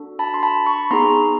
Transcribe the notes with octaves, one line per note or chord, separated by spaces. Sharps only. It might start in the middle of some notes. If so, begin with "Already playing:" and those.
Already playing: D4 F#4 A4
A5 B5
C6
A5 B5
B5 C#6
B3 D#4 G#4 A#5 C6